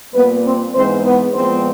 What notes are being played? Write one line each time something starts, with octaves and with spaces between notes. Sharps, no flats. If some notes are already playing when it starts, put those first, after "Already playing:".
A#2 G3 A#3 B3 B4
C4 C5
G#2 E3 G#3 B3 C4 C5
B3 B4
A#2 F3 G#3 B3 C4 C5